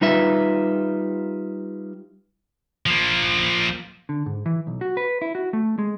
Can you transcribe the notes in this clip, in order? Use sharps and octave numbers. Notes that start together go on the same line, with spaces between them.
G3 D#4 F4 B4 E5
F3 A#3
D3
G#2
E3
B1
F#4
B4
E4
F#4
A3
G#3